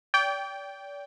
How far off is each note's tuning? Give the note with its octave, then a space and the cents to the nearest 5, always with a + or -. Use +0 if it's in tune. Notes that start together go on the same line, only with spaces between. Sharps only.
D5 -40 G5 +0